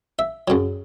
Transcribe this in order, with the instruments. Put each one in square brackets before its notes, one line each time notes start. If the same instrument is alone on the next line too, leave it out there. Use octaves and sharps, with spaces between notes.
[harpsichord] E5
F#2 C#3 F#3